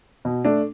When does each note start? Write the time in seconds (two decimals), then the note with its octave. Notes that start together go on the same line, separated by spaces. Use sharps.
0.25 B2
0.45 A3 D4